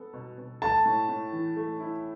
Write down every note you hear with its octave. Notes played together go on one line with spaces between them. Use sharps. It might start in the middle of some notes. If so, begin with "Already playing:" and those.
Already playing: B3 A4
B2
B2
A3 A5
A2
A2
E3
A3
E4